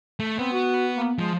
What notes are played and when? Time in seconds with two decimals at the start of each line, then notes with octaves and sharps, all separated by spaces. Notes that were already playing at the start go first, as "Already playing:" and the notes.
0.20 A3
0.39 B3 C4
0.52 F#4
0.95 A#3
1.19 F3 G#3